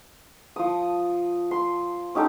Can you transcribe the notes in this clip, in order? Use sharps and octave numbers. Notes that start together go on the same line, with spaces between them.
F3 D#6
C6
C#4 D#4 G4 A4